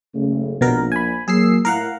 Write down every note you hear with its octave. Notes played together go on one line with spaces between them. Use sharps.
F#1 C#3 A3
A#1 B2 B3 A#4
G#5 B5
F#3 A#3 G#4 E6 C7
A2 E4 A#4 F5 F#5